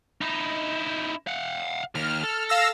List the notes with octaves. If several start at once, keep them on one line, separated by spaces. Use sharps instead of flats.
D#4 E4
F5 F#5
D#2 F6
A4
F5 E6 A#6